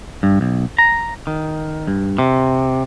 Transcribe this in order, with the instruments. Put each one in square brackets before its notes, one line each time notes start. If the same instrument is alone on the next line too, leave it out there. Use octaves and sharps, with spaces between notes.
[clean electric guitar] G2
B1
A#5
D#3
G2
C3